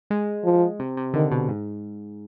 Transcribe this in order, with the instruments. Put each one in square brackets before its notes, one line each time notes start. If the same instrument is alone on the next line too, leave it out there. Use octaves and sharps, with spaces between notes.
[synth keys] G#3
[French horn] F3
[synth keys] C3
C3
[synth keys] D3 [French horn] D#3
[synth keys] B2
G#2